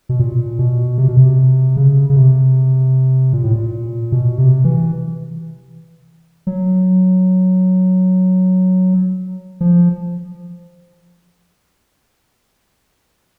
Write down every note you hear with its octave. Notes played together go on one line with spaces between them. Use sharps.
B2
A#2
B2
C3
B2
C3
C#3
C#3
C3
A#2
A2
A#2
B2
C3
E3
F#3
F3